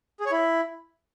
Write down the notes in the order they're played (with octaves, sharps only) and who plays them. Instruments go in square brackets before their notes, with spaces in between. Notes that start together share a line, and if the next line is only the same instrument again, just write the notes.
[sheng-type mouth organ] G#4
C#5
E4